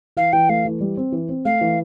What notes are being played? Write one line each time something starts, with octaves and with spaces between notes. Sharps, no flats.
E3 F5
E3 G5
A3 F5
E3
G3
C4
E3
C4
A3 F5
E3